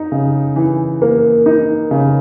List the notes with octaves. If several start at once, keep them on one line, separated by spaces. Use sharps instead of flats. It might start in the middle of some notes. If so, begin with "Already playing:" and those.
Already playing: D#4
C#3
E3
A#3
D#4
C#3